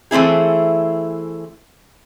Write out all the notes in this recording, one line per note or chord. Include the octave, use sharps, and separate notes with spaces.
E3 A3 C4 E4 G#4